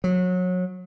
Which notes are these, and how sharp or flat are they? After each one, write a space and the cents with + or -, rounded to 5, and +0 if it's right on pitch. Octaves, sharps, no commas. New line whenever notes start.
F#3 -25